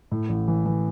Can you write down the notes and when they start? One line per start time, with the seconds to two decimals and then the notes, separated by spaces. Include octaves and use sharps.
0.11 A2
0.29 A1
0.48 E3
0.66 E3